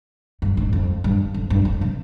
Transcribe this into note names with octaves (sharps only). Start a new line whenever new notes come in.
G2
G#2
F2
G2
F2
G2
F2
C3